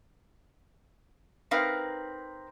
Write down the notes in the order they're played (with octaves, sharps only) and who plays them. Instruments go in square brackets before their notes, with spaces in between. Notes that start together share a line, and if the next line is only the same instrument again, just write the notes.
[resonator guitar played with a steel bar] C4 D#4 A#4 B4 F5